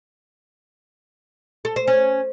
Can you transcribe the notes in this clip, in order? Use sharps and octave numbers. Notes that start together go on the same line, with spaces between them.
A4
C5
C#4